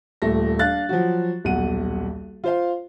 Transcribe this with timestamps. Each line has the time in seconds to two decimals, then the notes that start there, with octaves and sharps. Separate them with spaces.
0.22 D#1 A#2 A3 A#6
0.59 D4 F5 F#6 A6
0.89 F3 F#3 F#4
1.45 D#1 B1 F#5 D#7
2.44 F4 C5 F5